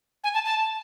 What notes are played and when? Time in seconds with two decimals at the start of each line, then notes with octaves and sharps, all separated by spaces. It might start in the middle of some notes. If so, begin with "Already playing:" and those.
0.24 G#5
0.34 A5
0.45 A5